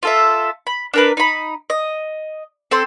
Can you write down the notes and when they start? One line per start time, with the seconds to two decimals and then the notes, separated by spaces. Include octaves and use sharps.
0.03 F4 A4 E5
0.67 B5
0.94 D4 A#4 B4
1.17 D#4 B5
1.70 D#5
2.71 C4 A4 C6